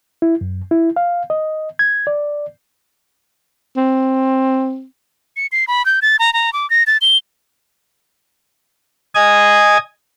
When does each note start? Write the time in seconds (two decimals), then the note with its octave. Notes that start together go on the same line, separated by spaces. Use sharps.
0.22 E4
0.41 F#2
0.71 E4
0.96 F5
1.30 D#5
1.79 G#6
2.07 D5
3.77 C4
5.36 C#7
5.52 C7
5.67 B5
5.85 G6
6.02 A6
6.19 A#5
6.33 A#5
6.53 D6
6.70 A#6
6.87 A6
7.01 G7
9.15 D#5 G#5 D#6 G#6